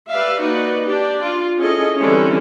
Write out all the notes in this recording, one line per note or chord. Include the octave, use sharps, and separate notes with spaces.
G4 B4 D5 E5 F5
A#3 D#4 F#4 B4 D5
D4 G4 D5
F4
C#4 E4 G#4 A4 D#5
D3 E3 G3 C4 C#4 E4